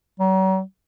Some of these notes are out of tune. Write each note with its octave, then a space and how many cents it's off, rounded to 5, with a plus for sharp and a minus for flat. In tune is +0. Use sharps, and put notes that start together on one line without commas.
F#3 +40